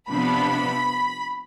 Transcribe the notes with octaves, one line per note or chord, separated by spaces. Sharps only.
C3 F3 B3 D4 B5